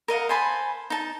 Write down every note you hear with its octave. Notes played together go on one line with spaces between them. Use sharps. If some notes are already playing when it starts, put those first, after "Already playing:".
A#4 D#5 F5 F#5
C5 G#5 A5 B5
D#4 A5